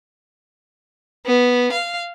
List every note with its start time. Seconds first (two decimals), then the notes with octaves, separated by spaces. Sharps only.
1.26 B3
1.72 F5